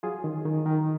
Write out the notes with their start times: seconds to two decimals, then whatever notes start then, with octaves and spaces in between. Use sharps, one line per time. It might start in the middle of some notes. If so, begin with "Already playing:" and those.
0.03 F#3 F4 G#4
0.24 D#3
0.45 D#3
0.66 D#3